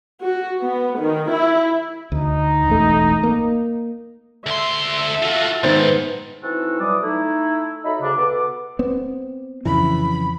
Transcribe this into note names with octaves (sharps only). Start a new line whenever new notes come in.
F#4
B3
D#3
E4
D2 D#4
E1 A1 A3
A#3
D2 A4 E5 C6
F4 F#4
G#2 D#3 B3 B4 C5 A6
E3 C4 D#4 E4 F#4 A4
B2 E3 F#3 G3 D6 D#6
A3 D#4 E4
F#3 D#4 A4 E5 B5
D2 C#3 D4
B2 B3 A4 D6
B3 C4
F2 C#3 E3 B5